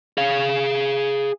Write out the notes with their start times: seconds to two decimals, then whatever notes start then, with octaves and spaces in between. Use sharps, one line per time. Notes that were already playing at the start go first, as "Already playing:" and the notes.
0.18 G#4 F5